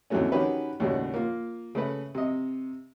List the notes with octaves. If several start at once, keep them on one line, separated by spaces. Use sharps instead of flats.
D#2 C3 E3 F#3 A3 C#4
D#3 C#4 F#4 G4 B4
D#2 A2 C#3 G3 F#4
A#3 F4
C#3 A3 B4
C3 D#5